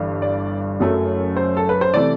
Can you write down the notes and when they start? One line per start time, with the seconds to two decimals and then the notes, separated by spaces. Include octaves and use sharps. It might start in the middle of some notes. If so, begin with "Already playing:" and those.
Already playing: G1 G2 E3
0.22 D5
0.79 F#1 F#2 F#3 A3
1.37 C5
1.57 A4
1.69 B4
1.81 C5
1.94 C3 E3 A3 D5